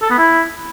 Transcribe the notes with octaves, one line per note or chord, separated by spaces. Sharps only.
A4
B3
E4